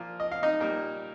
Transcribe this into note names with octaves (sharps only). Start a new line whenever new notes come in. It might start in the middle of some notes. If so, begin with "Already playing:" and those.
Already playing: A#2 F3 A#3 F4
D#5
F5
D#4 D#5
A#2 G3 A#3